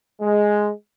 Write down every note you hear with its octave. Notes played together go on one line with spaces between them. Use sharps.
G#3